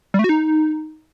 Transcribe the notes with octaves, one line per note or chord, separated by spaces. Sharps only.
G3
A3
F#4
D#4